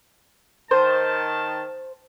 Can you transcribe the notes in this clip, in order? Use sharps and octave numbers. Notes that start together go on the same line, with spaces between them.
D#3 C5 A5